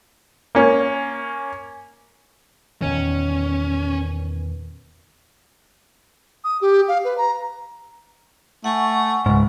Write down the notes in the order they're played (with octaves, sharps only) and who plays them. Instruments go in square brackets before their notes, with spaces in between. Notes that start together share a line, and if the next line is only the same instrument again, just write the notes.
[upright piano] A#3 C#4
[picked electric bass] E2 A#2 D#3 [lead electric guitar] C#4
[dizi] D#6
G4
F5
B4
A#5
[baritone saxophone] A3 [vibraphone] F#5 G#5 C#6
[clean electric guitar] C#2 G#2